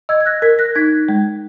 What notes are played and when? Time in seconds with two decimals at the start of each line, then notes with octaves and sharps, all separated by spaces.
0.09 D#5 E6 G#6
0.21 G#6
0.26 F#6 A#6
0.42 A#4 G#6 B6
0.59 F#6 A#6
0.75 D#4 G#6 B6
1.09 G#3